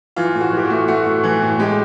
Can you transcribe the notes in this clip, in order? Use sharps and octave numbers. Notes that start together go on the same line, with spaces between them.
E3 F4
A2
F#4
E3 G4
F#4
A3
A3 F#4
A2
E3
A2
G#3 G4